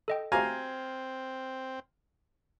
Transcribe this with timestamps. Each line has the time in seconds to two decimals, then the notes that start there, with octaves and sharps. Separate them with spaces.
0.08 A4 D#5 G5
0.32 C4 F#4 G4 C5 F5 G#5 A#5